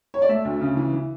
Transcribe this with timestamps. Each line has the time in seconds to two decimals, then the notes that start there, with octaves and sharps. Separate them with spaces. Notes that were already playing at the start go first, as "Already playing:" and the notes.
0.14 C#5
0.22 D5
0.29 A3 E5
0.45 D2
0.61 C#3
0.77 E3
0.93 E3